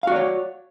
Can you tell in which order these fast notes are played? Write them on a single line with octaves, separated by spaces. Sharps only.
F5 F#4 D5 C#5